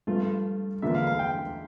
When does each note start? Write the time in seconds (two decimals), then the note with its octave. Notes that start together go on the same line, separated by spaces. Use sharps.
0.07 G2 F3 A3 F4
0.82 E2 D3 F3 A#3 E5
0.95 F5
1.07 F5
1.19 G5